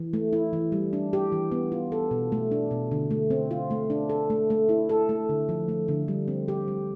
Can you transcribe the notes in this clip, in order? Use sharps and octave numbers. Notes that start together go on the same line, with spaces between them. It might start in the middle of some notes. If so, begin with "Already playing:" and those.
Already playing: E3
A3
E4
E3
G3
D4
G4
E3
B3
F4
A4
B2
A3
D4
B2
D3
A3
C4
F4
A3
D4
A4
A3
A3
E4
A4
A3
D3
F3
A3
D3
G3
C4
G4
G3